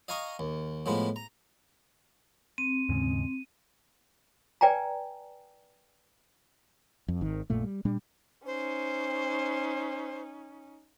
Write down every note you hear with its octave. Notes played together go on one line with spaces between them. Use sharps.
D#5 F5 G#5 A#5 C#6 D#6
D#2
A2 F3 G#3 B3
A#5
C4 D#7
D#2 G#2 C#3
B4 D5 G5 G#5 A#5
F2
G#1 D#3
A#1 F#2 A#2 A3
G3
A#2 G3 D4
C#4 D#4 C5